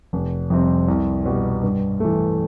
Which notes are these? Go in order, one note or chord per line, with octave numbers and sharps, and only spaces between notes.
F1
F2 C3 G3 C4
C2
B2 G3
G2
E3 A3